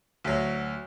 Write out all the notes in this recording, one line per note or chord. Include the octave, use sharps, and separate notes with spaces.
D2 F#3